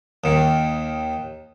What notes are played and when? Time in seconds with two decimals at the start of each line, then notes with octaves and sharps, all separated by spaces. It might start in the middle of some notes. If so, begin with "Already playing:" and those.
0.24 D#2 D#3